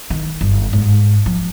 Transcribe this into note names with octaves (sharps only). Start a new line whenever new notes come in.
D#3
G1
G#2
F3